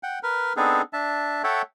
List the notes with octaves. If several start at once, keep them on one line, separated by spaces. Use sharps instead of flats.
F#5 G5
A#4 B4
B3 C4 D4 D#4 G#4 A4
D4 E5 A5
A4 C#5 E5 F#5 G5